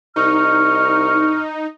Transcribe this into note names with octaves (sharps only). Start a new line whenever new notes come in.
C2 D#4 C#6 F6